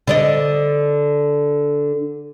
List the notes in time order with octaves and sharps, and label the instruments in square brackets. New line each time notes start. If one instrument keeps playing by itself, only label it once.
[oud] D3 D5 D#5